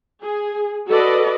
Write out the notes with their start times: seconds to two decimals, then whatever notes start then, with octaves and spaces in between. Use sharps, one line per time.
0.23 G#4
0.89 F#4 A4 B4 D5 D#5